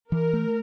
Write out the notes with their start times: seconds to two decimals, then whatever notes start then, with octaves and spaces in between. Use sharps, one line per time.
0.11 E3 A#4
0.33 A3